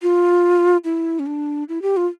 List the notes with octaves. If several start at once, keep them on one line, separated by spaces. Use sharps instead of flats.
F4
E4
C#4
D4
E4
G4
F4